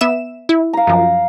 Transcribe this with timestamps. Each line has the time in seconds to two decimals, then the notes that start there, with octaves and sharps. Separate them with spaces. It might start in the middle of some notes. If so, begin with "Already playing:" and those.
0.01 B3 E5 E7
0.49 E4
0.73 F5 A#5
0.87 F#2 F3